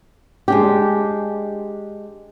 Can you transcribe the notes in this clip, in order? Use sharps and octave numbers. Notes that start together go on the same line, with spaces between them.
G#3 D4 G4